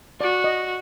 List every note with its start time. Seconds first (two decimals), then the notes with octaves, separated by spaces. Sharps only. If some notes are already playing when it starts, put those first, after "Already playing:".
0.20 F#4 D5
0.44 D#5